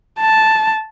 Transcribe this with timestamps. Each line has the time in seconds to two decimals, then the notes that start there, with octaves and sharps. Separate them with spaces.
0.20 A5